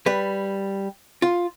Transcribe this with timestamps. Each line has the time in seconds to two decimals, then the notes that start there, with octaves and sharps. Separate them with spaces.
0.06 G3 B4
1.22 F4